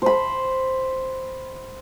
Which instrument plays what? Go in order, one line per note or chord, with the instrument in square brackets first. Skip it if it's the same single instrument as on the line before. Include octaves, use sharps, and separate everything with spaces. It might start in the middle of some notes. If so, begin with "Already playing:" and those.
[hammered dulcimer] C5 B5